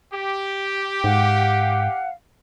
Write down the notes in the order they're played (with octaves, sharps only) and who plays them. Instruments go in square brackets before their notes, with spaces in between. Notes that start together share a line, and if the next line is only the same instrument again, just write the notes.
[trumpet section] G4
[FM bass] G#2 [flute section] F5 F#5